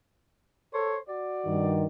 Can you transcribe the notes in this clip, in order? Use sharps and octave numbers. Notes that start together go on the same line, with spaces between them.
A4 C5 C#5
F#4 D5
G2 D#3